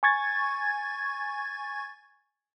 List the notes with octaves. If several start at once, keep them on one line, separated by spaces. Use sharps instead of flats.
G#5 C#6 G#6 A6